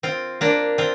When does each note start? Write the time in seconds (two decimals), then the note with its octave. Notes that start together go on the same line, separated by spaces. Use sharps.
0.03 C4 F4
0.41 A#3 D4
0.78 C4 F4